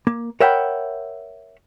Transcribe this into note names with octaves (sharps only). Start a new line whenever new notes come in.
A#3
A#4 C#5 E5 F#5 G5 B5